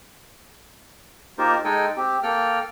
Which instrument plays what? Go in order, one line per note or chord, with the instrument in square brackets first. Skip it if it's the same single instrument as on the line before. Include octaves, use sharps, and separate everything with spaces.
[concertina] A#3 D#4 F4 G4 A#4 C5
G#3 D#4 A4 G5 G#5
C4 G4
A#3 A4 G5 F6